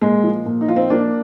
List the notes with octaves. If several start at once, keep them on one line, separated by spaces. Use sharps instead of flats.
A#2 G#3
F3
A#2
D#4
F3 F4
C4 D#4
F3 A#3 D4